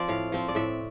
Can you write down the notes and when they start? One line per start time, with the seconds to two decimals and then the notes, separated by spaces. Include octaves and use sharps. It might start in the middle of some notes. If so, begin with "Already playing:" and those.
Already playing: F3 C4 C5 D5
0.08 A2 F5
0.32 F3 C4
0.48 D5
0.55 A2 E5